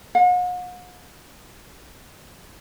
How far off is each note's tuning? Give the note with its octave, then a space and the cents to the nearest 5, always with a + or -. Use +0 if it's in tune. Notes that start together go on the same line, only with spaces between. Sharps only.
F#5 -45